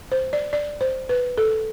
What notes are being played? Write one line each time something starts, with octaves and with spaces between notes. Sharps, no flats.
C5
D5
D5
C5
B4
A4